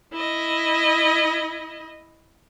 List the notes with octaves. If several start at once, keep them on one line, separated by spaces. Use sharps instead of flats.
E4 D#5